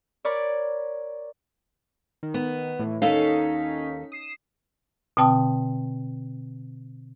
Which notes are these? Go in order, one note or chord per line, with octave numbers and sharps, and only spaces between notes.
A#4 C#5 D5 B5 D6
D#3
B3
A2 E3
D#2 C#4 D#4 A4 F5 B6
D#6 C7 E7
B2 D3 C4 G5 A5 D#6